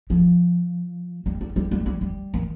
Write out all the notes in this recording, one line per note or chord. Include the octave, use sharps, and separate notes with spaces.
F3
G3
G3
G3
G3
G3
G3
D#3